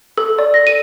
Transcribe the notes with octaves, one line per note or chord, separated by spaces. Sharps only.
A4
D5
A#6
D#7